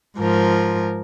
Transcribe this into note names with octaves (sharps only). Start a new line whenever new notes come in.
G#2 F3 A#4